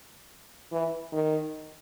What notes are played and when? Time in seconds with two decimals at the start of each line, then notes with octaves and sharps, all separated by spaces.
0.72 E3
1.13 D#3